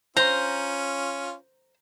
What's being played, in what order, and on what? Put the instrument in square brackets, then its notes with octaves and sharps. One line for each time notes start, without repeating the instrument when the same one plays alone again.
[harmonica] C#4 F4 [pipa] C5 [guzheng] A#5